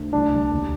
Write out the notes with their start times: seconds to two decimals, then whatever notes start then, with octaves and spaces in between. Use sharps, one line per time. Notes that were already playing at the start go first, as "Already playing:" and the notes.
Already playing: D2
0.12 C2 D4
0.32 C2
0.51 D#2